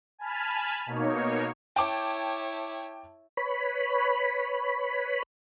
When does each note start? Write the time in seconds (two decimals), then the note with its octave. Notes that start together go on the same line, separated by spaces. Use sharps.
0.19 G#5 A5 B5 F6
0.86 B2 A#3 D#4 C#5
1.76 E4 C#5 G5 A5 D6
3.37 B4 C#5 B5